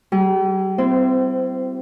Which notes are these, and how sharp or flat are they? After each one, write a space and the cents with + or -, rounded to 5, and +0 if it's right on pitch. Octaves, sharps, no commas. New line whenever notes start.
G3 -40 G#4 +0
C4 -25 E4 +30 C5 -10